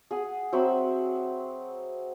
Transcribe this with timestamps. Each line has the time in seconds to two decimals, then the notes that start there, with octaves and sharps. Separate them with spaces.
0.11 G#4 F#5 D#6
0.53 F#3 C4 E5 B5